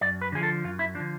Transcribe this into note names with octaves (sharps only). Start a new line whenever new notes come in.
F#2 D5
B4
D3 F3 G#4
A4
F#2 F4
E4
F3 D4
D3